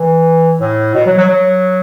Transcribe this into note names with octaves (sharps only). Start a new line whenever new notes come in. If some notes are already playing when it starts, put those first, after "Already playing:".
Already playing: E3
A2
B2
F#3
F#3
F#3